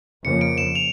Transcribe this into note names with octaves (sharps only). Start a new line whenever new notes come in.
F2 C#3 F3 A#3 C#7
D7
E7
F7